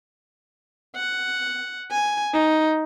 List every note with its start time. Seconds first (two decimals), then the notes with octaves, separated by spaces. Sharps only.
0.96 F#5
1.92 G#5
2.34 D#4